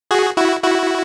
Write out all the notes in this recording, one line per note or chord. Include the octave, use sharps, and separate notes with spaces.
F#4 G#4
E4 F#4
E4 F#4